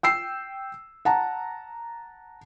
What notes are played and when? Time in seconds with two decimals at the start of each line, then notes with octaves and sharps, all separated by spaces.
0.03 G5 E6 C7
1.05 F#5 A5 A#5